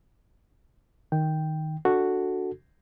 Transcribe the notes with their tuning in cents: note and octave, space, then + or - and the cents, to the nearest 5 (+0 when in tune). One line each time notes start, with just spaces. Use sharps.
D#3 +0 G5 +0
D4 +0 F#4 +0 A4 +5